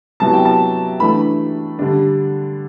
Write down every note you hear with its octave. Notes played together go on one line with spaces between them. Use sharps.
C3 F#3 B3 E4 A5
G5
A5
E3 A3 D4 B5
D3 G3 D4